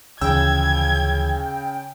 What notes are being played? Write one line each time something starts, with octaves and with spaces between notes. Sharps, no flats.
D2 C#3 E3 F3 G5 E6 G#6